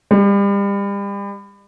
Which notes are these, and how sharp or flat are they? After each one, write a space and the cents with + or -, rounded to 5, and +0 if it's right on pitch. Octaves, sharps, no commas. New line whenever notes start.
G3 +35